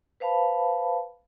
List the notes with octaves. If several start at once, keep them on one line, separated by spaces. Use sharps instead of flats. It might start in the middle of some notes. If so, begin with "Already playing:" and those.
B4 C5 F5 A5 B5